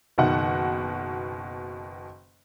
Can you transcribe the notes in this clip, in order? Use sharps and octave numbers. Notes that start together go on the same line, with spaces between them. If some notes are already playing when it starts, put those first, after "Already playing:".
F#1 B2 D#3 F#5